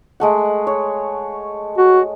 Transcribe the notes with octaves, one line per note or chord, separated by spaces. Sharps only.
G#3 A3 F#5
C#5
F#4